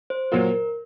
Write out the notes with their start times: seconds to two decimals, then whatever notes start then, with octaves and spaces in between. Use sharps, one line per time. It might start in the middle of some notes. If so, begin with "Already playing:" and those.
0.10 C5
0.32 A#2 F#3 A#3 F4 A#4